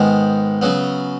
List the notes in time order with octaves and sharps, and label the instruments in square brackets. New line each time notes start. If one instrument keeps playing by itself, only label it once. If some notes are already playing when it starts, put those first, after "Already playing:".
Already playing: [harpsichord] G#2 D#3 G#3 B3
C#3 F#3 B3